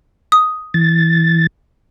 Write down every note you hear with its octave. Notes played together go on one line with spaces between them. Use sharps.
D#6
E3 A6